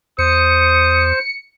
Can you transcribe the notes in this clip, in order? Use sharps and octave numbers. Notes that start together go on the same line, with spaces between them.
E2 C5 D#6 C#7